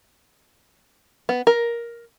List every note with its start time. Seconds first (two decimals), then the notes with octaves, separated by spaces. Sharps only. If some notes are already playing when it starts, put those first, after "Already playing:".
1.29 B3
1.47 A#4